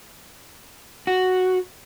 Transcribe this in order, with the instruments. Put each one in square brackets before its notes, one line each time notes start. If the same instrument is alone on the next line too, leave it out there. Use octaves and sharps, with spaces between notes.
[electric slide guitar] F#4